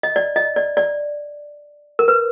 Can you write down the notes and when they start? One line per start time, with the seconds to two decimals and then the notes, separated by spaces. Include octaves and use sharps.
0.03 D#5
0.16 D5
0.36 D#5
0.56 D5
0.77 D5
1.99 A#4
2.08 B4